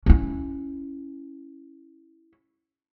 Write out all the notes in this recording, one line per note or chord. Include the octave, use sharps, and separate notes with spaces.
C#4 E4